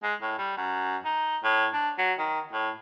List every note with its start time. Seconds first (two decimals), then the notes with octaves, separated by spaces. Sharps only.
0.03 G#3
0.22 A2
0.38 G3
0.57 F#2
1.05 D#4
1.44 A2
1.73 D4
1.98 F#3
2.18 D#3
2.53 A2